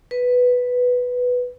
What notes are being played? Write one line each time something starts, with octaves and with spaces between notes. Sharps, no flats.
B4